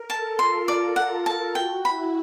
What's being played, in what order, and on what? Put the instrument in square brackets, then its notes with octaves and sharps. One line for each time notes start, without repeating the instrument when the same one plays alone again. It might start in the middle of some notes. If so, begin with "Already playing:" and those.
Already playing: [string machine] A#4
[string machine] A4 [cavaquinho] A5
[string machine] F4 [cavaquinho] C6
[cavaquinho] D5
F#5
A5
[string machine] F#4 [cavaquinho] G5
[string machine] E4 [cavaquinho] B5